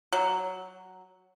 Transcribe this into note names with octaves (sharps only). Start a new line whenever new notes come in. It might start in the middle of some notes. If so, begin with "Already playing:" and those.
F#3